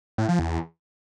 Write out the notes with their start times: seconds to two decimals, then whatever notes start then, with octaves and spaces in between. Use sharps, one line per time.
0.18 A2
0.29 F3
0.39 E2